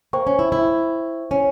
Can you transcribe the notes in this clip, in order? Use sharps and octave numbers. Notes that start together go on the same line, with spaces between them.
A#3 C5 G5 C#6
C#4
E4
E4
C#4